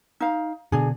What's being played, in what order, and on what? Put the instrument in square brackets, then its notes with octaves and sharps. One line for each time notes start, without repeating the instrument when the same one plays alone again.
[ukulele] D#4 F5
[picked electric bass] B2 D3 [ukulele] D4 G#4